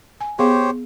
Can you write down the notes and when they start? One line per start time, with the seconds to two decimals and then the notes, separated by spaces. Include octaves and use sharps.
0.21 G#5
0.39 B3 G4 G#4 C5 C#5 F5